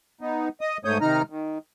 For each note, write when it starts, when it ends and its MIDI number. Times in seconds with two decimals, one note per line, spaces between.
0.21 0.49 59
0.21 0.49 63
0.61 0.77 75
0.61 0.77 87
0.85 0.98 44
0.85 0.98 57
0.85 0.98 73
0.85 0.98 87
0.85 0.98 91
1.01 1.22 48
1.01 1.22 51
1.01 1.22 63
1.01 1.22 82
1.01 1.22 89
1.30 1.58 51